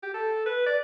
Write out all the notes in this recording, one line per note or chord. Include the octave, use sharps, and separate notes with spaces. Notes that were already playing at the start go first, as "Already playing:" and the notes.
G4
A4
B4
D5